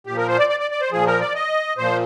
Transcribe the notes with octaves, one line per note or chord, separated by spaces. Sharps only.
A#2 F3 G4
A#4
C5
D5
D5
D5
D5
C5
A#2 F3 G#4
A#4
D5
D#5
A#2 F3 C5